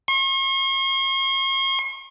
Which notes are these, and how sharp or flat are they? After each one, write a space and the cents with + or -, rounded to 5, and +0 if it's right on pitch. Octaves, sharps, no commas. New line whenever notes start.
C#6 -45